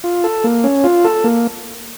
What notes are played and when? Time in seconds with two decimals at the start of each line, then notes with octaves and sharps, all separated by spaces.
0.04 F4
0.24 A4
0.44 A#3
0.64 C#4
0.84 F4
1.05 A4
1.24 A#3